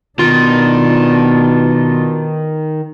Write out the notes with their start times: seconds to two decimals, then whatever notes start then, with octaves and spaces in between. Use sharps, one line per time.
0.19 B2 D#3 B3 D4 F4